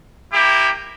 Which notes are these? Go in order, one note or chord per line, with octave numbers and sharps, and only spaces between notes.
A#3 E4 G4